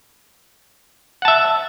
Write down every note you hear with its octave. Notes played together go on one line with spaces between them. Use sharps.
E5 F#5 A5